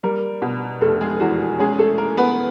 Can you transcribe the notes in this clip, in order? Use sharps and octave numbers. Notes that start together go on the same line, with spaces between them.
G3 A#3 A#4
B2
F1 A3 A4
G#3 G#4
E2 F#4
G#3 C#4 G#4
A3 A4
A#3 A#4
B3 B4